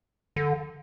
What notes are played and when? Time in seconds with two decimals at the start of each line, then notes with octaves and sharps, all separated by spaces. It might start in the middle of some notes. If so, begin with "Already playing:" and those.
0.36 D3